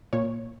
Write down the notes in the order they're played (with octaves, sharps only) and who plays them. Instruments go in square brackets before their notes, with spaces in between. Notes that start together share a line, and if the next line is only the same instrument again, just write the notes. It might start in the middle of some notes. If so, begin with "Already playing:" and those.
[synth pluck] A#2 C#5